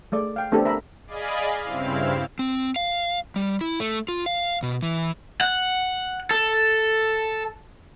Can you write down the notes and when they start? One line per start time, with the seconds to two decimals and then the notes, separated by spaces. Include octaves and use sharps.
0.12 G#3 A3 D5
0.36 F5 G5
0.52 A3 B3 C4 D4 G4 A4
0.65 A#4 E5 A#5 B5
1.07 G#4 D5 D#5 F5 G#5 B5
1.63 G2 C#3 C4 E4 F5
2.39 C4
2.76 F5
3.36 G3
3.61 E4
3.80 A3
4.09 F4
4.26 F5
4.63 B2
4.83 E3
5.41 F#5
6.31 A4